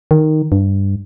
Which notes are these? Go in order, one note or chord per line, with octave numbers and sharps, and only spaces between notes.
D#3
G2